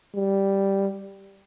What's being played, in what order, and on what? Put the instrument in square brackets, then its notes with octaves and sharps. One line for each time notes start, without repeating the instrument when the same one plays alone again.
[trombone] G3